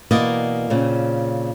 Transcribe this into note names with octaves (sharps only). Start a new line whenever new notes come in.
B2 E3 A#3 D5 D#5
A#2 C#3 C4